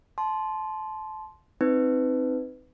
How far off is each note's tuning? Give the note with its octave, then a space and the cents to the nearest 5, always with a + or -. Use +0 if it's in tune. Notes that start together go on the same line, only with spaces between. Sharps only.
A5 -25 C6 +0
C4 +0 D#4 +5 B4 +20